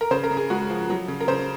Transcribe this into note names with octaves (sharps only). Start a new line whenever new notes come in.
A#4
C#3 C5
A#4
C#3
G#4
G#3 F#4
F3
F#3
C#3
A#4
C#3 C5